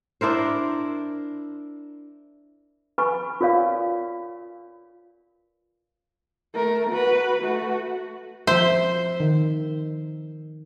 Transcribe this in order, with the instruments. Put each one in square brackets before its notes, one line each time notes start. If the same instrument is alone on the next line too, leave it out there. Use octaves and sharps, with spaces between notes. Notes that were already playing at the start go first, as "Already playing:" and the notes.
[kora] D4 E4 A#4 C5
[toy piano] B4 G#5 B5 C#6
F4 A#4 C#5 D5 F5
[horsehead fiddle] A3 A#4
F#4 B4
A3 F#4
[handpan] F3 E5 [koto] C5
[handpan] D#3